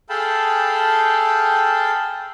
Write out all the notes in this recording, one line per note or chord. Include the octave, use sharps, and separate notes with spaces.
G#4 A4 F5 G5 A5 B5